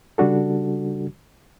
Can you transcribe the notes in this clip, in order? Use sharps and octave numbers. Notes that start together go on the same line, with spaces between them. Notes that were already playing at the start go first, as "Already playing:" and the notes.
C#3 G3 D4 F#4 A4